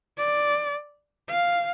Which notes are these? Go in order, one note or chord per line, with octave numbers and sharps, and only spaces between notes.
D5
F5